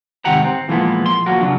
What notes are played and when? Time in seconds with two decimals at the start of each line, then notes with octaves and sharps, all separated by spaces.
0.25 G#2 C3 D#3 G4 F#5 A#5
0.44 C4
0.68 A#2 E3 F3 G#3 A#3 B3
1.06 C6
1.26 F3 F#3 A#3 F#4 A#4
1.40 C#3 F3 F#3 D4